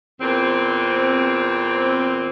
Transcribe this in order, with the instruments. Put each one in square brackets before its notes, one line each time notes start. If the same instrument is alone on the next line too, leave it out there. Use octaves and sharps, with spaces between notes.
[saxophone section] E2 A#2 C4